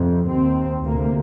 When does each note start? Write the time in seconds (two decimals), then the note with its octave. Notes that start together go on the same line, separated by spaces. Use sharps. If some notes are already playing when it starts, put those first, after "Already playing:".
Already playing: F2 C3
0.27 D#2 C4
0.86 D2 C3 A#3